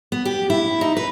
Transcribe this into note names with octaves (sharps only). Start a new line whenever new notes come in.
B3
G4
E4
D#4
B4